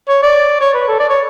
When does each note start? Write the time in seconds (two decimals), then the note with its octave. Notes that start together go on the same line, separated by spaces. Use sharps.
0.08 C#5
0.23 D5
0.61 C#5
0.74 B4
0.88 A4
1.00 D5
1.10 C#5